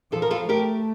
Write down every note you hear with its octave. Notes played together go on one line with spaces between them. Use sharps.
F3 F4 A4
A#4
F4 A4
A3 G4 A#4